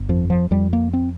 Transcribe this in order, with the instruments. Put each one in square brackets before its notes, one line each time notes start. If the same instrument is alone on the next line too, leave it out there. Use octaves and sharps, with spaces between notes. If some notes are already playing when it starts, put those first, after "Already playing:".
Already playing: [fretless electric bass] G1
F2 F3
F3
F2 G3
A#3
C4